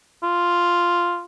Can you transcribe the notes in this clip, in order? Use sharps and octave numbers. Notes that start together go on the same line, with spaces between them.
F4